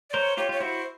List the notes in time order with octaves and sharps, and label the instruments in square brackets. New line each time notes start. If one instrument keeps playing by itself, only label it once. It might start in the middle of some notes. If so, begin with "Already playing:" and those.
[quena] D5
[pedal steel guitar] A#4 C5 [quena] C#5
[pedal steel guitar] F4 G4 [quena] C#5
[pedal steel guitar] F4 [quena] C#5
[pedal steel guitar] E4 F#4 [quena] C5